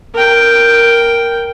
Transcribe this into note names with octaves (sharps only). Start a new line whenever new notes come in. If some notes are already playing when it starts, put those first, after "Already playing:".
A#4 G5